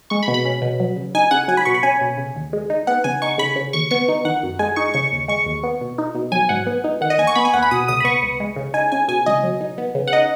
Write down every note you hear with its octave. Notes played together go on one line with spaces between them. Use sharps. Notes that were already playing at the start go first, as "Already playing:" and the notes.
G#3 C#6
B5
B2
B5
C#4
B2
F#3
C#3
D#4 G#5
C#3 F#5
F#3 G#5
B5
B2 C#6
B5
C#4 G#5
B2
C#3
D#2
G#3
D#4
B3 F#5
C#3 G#5
D#4 C#6
C#3 B5
C#3
D#2 C#6
B3 C#6
D#4
D#3 F#5
F#2
G#3 G#5
D#4 C#6
C#3 C#6
D#2
G#3 C#6
D#2
B3
B2
D#4
B2
F#3 G#5
G#2 F#5
B3
D#4
D#3 F#5
D#5
D#2 G#5
C#6
B3 B5
G#5
D#2 F#5
B5
B2 D#6
C#2 D#6
B5
B3 C#6
C#2
G#3
C#3
D#4 G#5
C#3 G#5
B2 G#5
C#2 D#5
F#3
D#4
B3
C#3
F#5
D#4 D#5